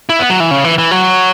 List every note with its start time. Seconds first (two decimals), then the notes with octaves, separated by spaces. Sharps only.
0.09 E4
0.19 B3
0.30 F#3
0.40 E3
0.51 C#3
0.64 E3
0.78 E3
0.91 F#3